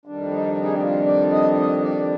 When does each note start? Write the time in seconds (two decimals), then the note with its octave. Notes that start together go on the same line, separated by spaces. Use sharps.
0.05 F2 D#3 G3 D4
0.31 D#4
0.57 D#4
0.65 G#4
0.73 G4
0.81 F4
1.06 D5
1.32 D#5
1.57 D#5
1.82 D5